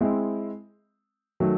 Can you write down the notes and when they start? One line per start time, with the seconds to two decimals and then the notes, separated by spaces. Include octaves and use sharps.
0.01 G#3 C4 E4
1.40 D#3 F#3 A3